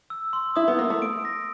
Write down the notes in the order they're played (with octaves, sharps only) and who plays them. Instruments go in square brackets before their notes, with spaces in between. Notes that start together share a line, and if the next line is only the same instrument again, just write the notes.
[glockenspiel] E6
C6
[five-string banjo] E4 [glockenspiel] D#6
[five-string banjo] B3
[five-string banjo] A#3 [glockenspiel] D#6
[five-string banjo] A3
[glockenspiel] D7
A#6